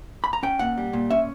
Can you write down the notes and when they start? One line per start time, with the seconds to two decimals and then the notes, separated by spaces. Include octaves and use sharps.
0.24 B5
0.33 A#5
0.43 C#4 G5
0.59 A#2 F#5
0.78 G3
0.93 A#2
1.11 C#4 E5